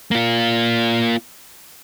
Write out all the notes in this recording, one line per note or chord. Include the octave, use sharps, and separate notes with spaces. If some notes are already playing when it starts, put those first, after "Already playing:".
A#3 F4